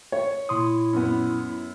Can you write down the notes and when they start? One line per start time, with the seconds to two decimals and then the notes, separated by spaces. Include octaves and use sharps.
0.12 C#5
0.49 A#2 E4 C6 D#6
0.93 F#2 B3